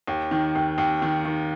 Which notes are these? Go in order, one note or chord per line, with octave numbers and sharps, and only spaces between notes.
D#2
D#3
D#2
D#2
D#3
D#3